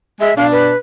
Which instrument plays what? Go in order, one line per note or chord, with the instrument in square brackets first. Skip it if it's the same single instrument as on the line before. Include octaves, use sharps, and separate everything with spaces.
[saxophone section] G#3 [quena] E5
[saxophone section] B2 D4 [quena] F5
[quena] B4